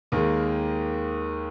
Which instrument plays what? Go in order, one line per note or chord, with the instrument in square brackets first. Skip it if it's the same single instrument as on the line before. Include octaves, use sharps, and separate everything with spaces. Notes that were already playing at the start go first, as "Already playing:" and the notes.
[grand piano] D#2 D#3 G#3 A#3